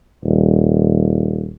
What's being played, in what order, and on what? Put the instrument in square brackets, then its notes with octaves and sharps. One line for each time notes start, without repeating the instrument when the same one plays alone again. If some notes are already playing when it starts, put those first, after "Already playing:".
[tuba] D#1